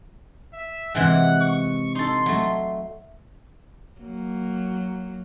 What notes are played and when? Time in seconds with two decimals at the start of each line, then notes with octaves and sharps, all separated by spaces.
0.53 E5
0.95 C3 E3 G#3 F#5
1.41 C#6
1.95 D#4 A4 C6
2.26 F#3 A3
4.00 F#3 A#3